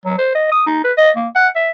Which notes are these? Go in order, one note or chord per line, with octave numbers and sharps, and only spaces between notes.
F#3
C5
D#5
D#6
D#4
B4
D#5
A#3
F#5
E5